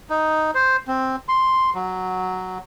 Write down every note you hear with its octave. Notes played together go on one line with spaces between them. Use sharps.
D#4
C5
C4
C6
F#3